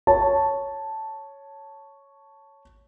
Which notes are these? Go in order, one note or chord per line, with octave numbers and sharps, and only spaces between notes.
C#5 A5